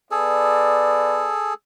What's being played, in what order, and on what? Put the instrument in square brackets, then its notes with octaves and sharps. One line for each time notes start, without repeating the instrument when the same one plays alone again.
[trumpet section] B3 D5 [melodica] G#4 A4